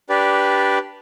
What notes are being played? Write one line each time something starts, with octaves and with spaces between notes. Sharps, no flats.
D4 G4 B4 D5